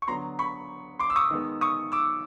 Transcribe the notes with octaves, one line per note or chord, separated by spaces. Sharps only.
C#6
D3 F#3 B3 A#5 C6
B5 C#6
C6 D6
E6
C#6 D#6
D#3 G#3 B3
C#6 D#6
D6 E6